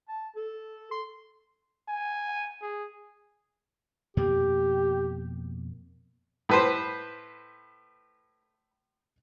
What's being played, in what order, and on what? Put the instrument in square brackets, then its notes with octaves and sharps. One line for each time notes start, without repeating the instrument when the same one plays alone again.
[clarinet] A5
A4
C6
[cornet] G#5
G#4
[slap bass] F2 B2 A#3 [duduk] G4
[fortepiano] A2 B4 C5